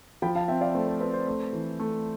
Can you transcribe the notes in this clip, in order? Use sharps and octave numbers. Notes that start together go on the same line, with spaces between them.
F3 G5 B5
F5 A5
C4 E5 G5
D5 F5
A3 C5
C5
C4 B4
C5
A3
E3
A3